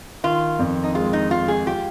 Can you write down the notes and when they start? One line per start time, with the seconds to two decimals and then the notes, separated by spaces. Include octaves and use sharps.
0.23 D#3 F4
0.59 F2
0.83 D#4
0.95 G#3 F4
1.13 D#4
1.31 G#3 F4
1.48 G#4
1.67 F4 G4